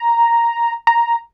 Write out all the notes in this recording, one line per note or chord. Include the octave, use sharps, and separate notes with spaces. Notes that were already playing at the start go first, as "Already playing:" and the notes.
Already playing: A#5
A#5